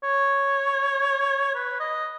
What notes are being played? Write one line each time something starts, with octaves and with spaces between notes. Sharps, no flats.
C#5
B4
D#5